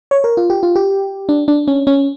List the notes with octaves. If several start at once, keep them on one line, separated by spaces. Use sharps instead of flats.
C#5
A#4
F4
G4
F4
G4
D4
D4
C#4
C#4